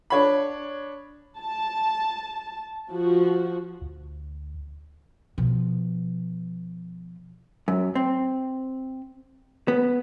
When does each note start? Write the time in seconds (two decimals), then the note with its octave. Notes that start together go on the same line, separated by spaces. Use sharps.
0.10 D4 C#5 B5
1.38 A5
2.91 F3 F#4
3.81 D2
5.38 B2 F3
7.68 F#2
7.95 C4
9.68 B3